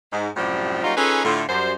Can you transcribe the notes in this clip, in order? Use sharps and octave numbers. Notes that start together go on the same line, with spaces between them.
G#2
F#2 A2 C3 F3 G3
F#3 G3 A#3 C#4 D#4 F4
C#4 D#4 F4 G#4 A4 B4
A2 D3 A3 F4
F#2 G3 C5